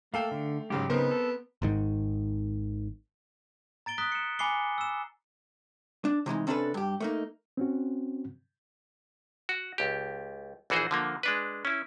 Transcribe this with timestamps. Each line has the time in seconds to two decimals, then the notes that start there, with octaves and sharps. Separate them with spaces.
0.14 A3 A#3 A4 F5 G5
0.31 D3
0.70 G#2 C#3 F#3 G4
0.90 C#3 B3 C4 D#4 A#4 C5
1.11 A4
1.62 G#1 G#2 D#3
3.86 A#5 A6 D7 G7
3.98 A#5 D#6 F#6 B6 G7
4.12 C#7 E7
4.39 G#5 B5 D6 C7 C#7 G7
4.78 E6 E7
6.05 D4
6.26 C3 E3 G#3 D#4
6.47 C3 C#4 D4 F#4 A4 B4
6.74 G2 G4
7.00 A3 A#3 D#4
7.57 C4 C#4 F#4
9.49 F#4
9.78 C#2 G4
10.70 A#1 E3 F#4 G#4 C5
10.91 D3 F3 A#3
11.23 G#3 D4 B4
11.65 C#4 E4